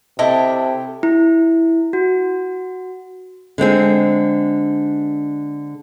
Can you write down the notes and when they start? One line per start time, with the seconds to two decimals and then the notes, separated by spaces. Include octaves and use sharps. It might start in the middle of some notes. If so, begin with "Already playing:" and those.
0.19 C3 E4 G4 A4 D#5
1.03 E4
1.93 F#4
3.58 D3 G#3 C4 G#4